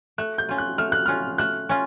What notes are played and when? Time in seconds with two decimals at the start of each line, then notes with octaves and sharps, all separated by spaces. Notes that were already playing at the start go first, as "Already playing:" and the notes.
0.18 A3 F#6
0.38 G6
0.49 C#4 F4
0.58 F#6
0.78 A3 F6
0.92 F#6
1.06 C#4 F4 F6
1.38 A3 F#6
1.69 C#4 F4